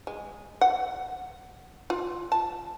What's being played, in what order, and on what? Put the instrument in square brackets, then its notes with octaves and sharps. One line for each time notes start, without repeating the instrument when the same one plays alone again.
[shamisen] G#3
F#5
F4
A5